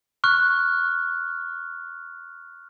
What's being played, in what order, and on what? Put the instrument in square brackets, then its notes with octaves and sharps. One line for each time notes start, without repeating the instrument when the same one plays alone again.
[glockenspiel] C#6 F6 F#6